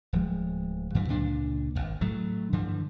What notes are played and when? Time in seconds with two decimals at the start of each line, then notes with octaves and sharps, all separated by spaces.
0.13 D1 F3 G#3
0.95 G2 D3 E3 F#3
1.09 C#2 A#2 D4
1.75 G#1 D#2
2.01 A2 F#3 A3
2.52 G2 D3 E3 F3